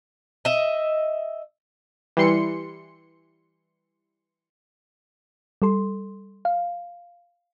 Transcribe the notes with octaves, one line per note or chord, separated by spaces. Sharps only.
D#5 E5
E3 G3 C6 C#7
G3 A4 C6
F5